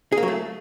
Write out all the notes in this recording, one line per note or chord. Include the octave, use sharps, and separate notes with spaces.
G#4
A#3
F#3
A3